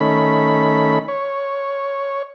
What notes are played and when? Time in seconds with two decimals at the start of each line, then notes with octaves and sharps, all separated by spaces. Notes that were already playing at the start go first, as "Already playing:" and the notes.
0.01 D#3 A3 C#4 B5
1.08 C#5